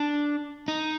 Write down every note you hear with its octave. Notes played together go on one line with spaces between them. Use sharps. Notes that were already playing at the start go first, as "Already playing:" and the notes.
Already playing: D4
D#4